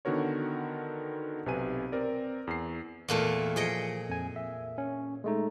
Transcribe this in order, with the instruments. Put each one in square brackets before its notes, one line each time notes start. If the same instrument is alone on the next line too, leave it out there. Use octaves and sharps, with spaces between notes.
[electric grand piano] D3 D#3 B3 F#4 A#4 C#5
B1 C3 B4 G#5 D#7
C4 A#4 D5
E2 C7
[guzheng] E2 A#2 A3
[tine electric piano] F3 C#7 [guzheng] G#4 D#5 G5
[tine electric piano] F2 G#5
E5
C#4
G#3 A3 D#4